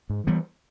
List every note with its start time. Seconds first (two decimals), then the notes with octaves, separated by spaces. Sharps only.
0.10 G#2
0.27 E3 G3 B3